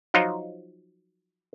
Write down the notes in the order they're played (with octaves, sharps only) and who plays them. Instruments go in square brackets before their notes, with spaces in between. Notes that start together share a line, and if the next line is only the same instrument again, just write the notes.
[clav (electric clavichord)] F3 F#3 D#4 F4